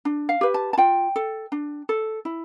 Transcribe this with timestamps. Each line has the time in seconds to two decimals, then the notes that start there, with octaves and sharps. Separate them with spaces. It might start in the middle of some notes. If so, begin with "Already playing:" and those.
0.05 D4
0.29 F5
0.41 G4 B4
0.54 A5
0.73 A5
0.78 F4 G5
1.16 A4
1.52 D4
1.89 A4
2.25 E4